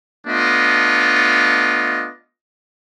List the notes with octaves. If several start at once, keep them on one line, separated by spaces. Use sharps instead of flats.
A3 B3 D4 F4 D#5